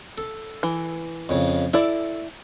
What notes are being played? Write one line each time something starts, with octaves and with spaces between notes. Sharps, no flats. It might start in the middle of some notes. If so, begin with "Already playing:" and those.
A4
E3
F2 C#3
E4 A4 D5